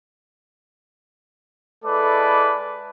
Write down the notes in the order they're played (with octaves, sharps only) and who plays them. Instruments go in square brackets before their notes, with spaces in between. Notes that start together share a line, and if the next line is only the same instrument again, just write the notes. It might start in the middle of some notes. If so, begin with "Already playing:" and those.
[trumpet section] G#3 E4 A4 B4 D5 D6